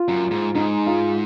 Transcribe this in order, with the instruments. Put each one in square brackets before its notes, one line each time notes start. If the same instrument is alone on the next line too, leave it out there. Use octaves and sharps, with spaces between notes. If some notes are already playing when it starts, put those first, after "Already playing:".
Already playing: [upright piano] F4
[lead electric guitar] F#2
G#2
[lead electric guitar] G#2 [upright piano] D#4
[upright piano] F4